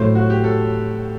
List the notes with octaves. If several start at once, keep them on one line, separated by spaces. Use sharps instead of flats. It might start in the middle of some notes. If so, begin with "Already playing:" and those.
Already playing: A2 F#3 A3 C5
F#4
G4
A4